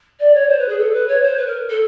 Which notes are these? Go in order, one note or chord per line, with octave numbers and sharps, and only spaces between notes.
D5
C#5
C5
B4
G#4
A4
B4
C#5
C5
B4
A#4
A4